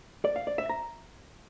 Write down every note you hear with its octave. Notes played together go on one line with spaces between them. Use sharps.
D5
F5
D5
E5
A#5